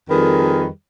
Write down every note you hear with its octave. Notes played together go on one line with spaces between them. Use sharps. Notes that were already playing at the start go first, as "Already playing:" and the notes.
F2 D#3 G3 G#4 A#4 B4